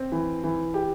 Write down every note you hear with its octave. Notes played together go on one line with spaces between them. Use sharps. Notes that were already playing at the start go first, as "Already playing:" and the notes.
Already playing: C4
E3
E3
G4